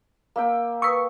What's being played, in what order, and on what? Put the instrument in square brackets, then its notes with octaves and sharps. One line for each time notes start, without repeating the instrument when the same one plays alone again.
[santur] A#3 E5 G5
[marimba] B4 D#6 E6 [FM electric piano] C#6